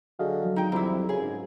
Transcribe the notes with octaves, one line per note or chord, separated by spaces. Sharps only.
D3 F#3 G#4 D#5 F5
F#3
G#1 D#4 G5
C2 F2 E3 E4
F#2 C#3 G#4
G#2